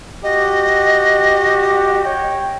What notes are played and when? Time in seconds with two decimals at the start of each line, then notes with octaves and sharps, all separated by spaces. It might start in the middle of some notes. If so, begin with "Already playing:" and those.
0.23 F#4 G4 D#5
2.04 C#5 G5